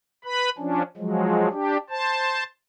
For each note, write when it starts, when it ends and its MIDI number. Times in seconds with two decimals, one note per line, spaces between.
0.25 0.50 71
0.25 0.50 83
0.58 0.82 53
0.58 0.82 61
0.58 0.82 62
0.97 1.49 53
0.97 1.49 54
0.97 1.49 56
1.52 1.77 62
1.52 1.77 67
1.90 2.44 72
1.90 2.44 81